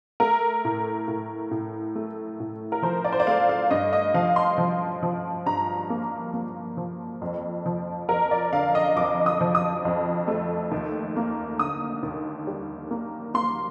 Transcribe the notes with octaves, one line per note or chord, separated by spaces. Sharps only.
A3 A#4
A2
A2
A2
A3
A2
A#4
F3 C5
D5
C5
D5
A3 F5
F5
G2 D#5
D#5
F3 F5
C6
F3
F3
G2 A#5
A#3
A#3
F3
F2
F3
F2 A#4
D5
D3 F5
D#5
F2 D6
D#6
F3
D#6
F2
A3
D#2
A#3
D3 D#6
D#2
G3
A#3
A#3 C6